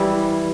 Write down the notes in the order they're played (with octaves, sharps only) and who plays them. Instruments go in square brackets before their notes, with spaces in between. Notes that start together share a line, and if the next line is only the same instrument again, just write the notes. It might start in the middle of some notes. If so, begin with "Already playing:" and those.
Already playing: [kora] E3 G3 E4